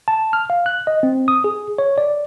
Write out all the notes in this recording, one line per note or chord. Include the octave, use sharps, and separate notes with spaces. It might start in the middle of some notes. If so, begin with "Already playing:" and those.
A5
F6
F5
F#6
D#5
C4
D#6
G#4
C#5
D5